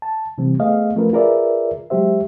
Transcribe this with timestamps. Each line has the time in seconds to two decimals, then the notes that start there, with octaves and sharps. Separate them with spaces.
0.02 A5
0.38 C3 E3 G3 C4
0.59 A3 B3 G#4 D#5 F5
0.96 F3 A3 C#4 F4 A#4 B4
1.13 F4 G#4 A#4 B4 D5 E5
1.90 F#3 G#3 G4 C5 E5